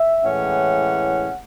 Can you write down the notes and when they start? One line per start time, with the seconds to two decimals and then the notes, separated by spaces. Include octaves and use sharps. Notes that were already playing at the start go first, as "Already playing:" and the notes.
Already playing: E5
0.23 A2 E3 G#3 C#4 F#5